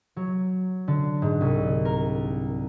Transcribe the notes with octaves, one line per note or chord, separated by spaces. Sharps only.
F#3
D3
G#2
C2
A#4